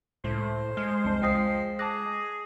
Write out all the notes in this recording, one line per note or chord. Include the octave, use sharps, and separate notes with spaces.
C#2 A2 C5
G#3 F6
C2 F2 D4
C#2 F3 D#5 G5 D#6 C7
G#4 A5 D6 F#6 A#6